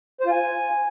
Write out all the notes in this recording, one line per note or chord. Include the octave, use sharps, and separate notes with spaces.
C5
F4
G#5